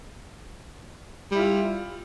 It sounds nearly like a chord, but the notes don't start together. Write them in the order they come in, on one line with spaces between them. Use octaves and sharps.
G3 E4 F4